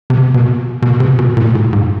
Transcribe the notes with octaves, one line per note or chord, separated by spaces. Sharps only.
C3
B2
B2
C3
B2
A#2
A2
G#2